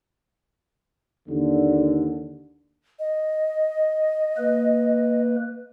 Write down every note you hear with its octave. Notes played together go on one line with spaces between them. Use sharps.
D#2 D3
D#5
A#3 B4